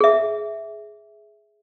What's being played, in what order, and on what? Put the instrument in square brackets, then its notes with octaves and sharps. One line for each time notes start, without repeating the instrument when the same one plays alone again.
[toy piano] G#4 E5